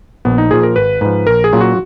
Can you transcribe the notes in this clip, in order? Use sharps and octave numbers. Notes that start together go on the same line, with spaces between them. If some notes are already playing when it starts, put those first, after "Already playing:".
A#1 B3
D#4
A#2 F3 G#4
A#4
G#1 B4
G#2 F3 B4
A#1 A#4
G#4
A#2 F#3 C#4 F4
F#4